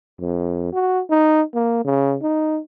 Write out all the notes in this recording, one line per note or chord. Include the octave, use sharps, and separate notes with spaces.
F2
F#4
D#4
A#3
C#3
D#4